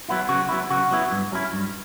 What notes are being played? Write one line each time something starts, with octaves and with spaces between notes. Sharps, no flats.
F#3 B3 E4
C#3 F#4
F#3 B3 E4
C#3 F#4
F#3 B3 E4
G2
F#3 C#4 E4
G2